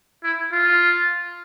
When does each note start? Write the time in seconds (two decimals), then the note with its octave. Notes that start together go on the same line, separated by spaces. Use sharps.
0.24 E4
0.52 F4